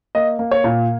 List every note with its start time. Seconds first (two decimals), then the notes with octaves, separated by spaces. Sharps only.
0.15 A#3 D#5
0.39 A#3
0.51 C#5
0.64 A#2